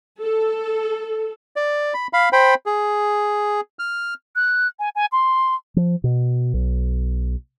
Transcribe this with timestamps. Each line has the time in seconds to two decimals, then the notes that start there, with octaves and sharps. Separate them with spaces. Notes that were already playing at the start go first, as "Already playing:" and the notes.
0.22 A4
1.56 D5
1.94 B5
2.13 F5 B5
2.33 C5 G5 B5
2.66 G#4
3.79 F6
4.36 F#6
4.79 G#5
4.95 G#5
5.12 C6
5.76 F3
6.04 B2
6.54 B1